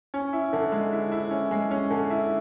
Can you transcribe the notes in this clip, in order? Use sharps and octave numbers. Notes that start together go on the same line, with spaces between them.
C#4
E4
D3
G#3
E4
E4
C#4
G#3
C#4
D3
E4